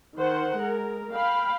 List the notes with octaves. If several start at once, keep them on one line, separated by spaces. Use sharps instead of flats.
D#3 C5 F#5
G#3 A#4
F5 G5 B5